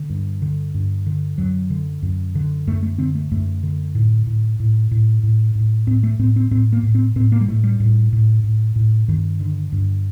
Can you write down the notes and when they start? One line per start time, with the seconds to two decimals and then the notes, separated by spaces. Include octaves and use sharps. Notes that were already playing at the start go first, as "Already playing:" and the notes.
Already playing: D3
0.10 G2
0.42 D3
0.74 G2
1.06 D3
1.38 F#2 F#3
1.70 D3
2.02 F#2
2.35 D3
2.67 F#2 A3
2.83 A3
2.98 D3 C4
3.15 A3
3.31 F#2 A3
3.63 D3
3.95 A2
4.26 A2
4.60 A2
4.91 A2
5.23 A2
5.55 A2
5.87 A2 C4
6.03 A3
6.19 A2 C4
6.36 C4
6.51 A2 C4
6.73 A#3
6.83 A2
6.95 C4
7.16 A2 C4
7.32 A#3
7.41 G3
7.48 A2 A3
7.64 G3
7.80 A2
8.13 A2
8.44 A2
8.76 A2
9.08 G2 D#3
9.40 D3
9.72 G2